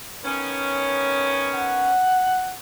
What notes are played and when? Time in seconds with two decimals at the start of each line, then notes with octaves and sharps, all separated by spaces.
0.24 D#3 B3 C#4
1.54 F#5